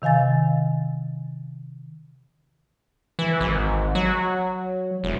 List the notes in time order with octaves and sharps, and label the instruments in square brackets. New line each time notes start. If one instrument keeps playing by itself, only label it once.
[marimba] C3 D#3 F5 G#5 A6
[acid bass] E3
G#1
F#3
E1